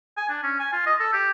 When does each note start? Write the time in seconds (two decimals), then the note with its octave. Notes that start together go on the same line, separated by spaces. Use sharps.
0.17 G#5
0.29 D4
0.43 C#4
0.59 G#5
0.73 F4
0.86 D#5
1.00 A4
1.13 G4